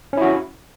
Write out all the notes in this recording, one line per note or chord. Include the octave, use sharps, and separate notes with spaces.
C#4 E4 F#4